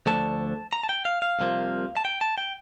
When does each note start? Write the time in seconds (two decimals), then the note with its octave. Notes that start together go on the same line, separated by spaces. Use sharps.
0.06 D2 D3 F3 A3 A5
0.73 A#5
0.83 A5
0.89 G5
1.05 F5
1.22 F5
1.39 C2 C3 F3 A#3
1.97 A5
2.05 G5
2.21 A5
2.38 G5